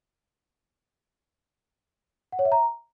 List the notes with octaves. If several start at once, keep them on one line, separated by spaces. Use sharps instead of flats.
F#5
C#5
E5
A#5